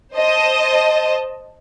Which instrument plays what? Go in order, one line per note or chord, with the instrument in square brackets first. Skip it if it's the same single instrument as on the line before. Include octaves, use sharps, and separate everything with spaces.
[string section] C5 D#5 A5